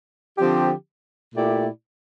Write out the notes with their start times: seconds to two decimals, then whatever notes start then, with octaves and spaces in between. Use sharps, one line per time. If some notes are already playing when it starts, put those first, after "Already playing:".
0.38 D3 F3 C4 G4
1.35 A#2 A3 E4 G4 D5